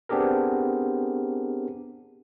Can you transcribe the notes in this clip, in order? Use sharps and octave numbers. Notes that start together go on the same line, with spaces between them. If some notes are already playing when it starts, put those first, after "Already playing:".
B3 C4 D4 G4 G#4 A#4